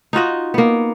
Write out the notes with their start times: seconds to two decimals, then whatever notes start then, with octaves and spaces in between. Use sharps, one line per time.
0.13 D#4 F4 F#4 D#5
0.54 A#3 B3